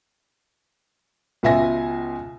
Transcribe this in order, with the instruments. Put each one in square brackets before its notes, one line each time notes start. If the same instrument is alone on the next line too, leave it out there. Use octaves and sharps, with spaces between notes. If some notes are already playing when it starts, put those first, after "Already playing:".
[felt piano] C#2 B2 F4 E5 G#5 A#6